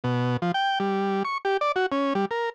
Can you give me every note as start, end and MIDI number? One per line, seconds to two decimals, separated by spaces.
0.04 0.37 47
0.42 0.52 53
0.54 0.79 79
0.80 1.23 55
1.25 1.38 85
1.45 1.57 67
1.61 1.72 74
1.76 1.86 66
1.92 2.13 61
2.15 2.25 55
2.31 2.50 70